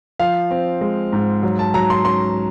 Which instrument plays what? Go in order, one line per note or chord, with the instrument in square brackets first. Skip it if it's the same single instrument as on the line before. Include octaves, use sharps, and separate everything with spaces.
[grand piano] F3 F5
C4
G#3
G#2
F#3
A5
F#3 A#5
C6
C#4 C6